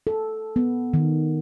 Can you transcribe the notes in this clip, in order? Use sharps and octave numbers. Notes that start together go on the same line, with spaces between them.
A4
B3
D#3